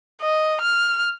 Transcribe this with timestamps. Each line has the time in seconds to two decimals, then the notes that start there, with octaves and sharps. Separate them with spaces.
0.21 D#5
0.61 F6